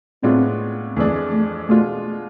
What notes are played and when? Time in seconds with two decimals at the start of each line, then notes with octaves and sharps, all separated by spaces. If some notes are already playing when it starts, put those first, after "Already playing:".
0.23 A2 G#3 B3 C4 D4 F4
0.96 F2 E3 G#3 A3 D4 G#4
1.33 A3
1.69 B2 G#3 A3 D4 F4